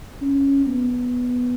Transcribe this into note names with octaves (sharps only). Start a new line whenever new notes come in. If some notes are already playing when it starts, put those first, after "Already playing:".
C#4
B3